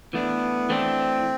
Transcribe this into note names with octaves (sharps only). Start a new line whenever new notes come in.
E3 A3 B3 D4
E3 A3 C4 D4